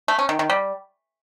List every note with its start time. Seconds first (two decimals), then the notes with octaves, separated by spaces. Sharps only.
0.08 A3
0.19 C#4
0.29 D#3
0.39 D#3
0.50 G3